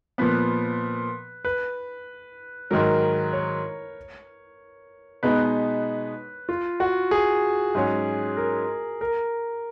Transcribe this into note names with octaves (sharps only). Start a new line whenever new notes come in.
A#2 F3 B3 B4
B4
G#2 D#3 F#3 A#4
C#5
B2 G#3 B3 D#4 B4
F4
F#4
G#4
G#2 F#3 C#4
A#4
A#4